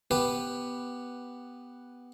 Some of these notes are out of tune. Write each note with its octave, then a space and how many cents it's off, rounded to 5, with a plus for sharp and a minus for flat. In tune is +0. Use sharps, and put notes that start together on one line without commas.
B3 +0 G4 +5 B4 +0